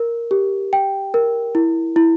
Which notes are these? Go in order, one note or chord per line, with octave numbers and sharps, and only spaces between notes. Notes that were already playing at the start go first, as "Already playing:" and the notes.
Already playing: A#4
G4
G5
A#4
E4
E4